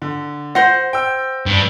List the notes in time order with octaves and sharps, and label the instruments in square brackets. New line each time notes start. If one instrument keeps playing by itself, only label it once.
[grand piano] D3
[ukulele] C5 F#5 [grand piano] A#6
[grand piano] G5 E6
[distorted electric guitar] G2